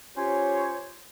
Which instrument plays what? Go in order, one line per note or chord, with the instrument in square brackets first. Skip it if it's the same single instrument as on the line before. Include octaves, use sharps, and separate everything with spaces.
[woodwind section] C#4 F4 G4 C5 C#5